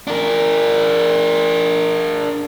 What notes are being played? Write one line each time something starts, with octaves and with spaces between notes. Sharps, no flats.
D4 A#4